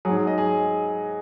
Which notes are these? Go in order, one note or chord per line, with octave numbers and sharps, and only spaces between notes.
G#2 F#3 G#4
G#4
D#5
G#4